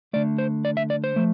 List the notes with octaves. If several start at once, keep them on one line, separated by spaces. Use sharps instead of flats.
D3 A3 D5
C5
D5
E5
D5
C5
F3 A3